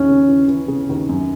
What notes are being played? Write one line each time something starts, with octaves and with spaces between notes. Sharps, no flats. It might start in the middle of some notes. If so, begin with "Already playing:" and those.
Already playing: D#2 C#4 E4
C#3
E3
E3
C#3
D#2
F#2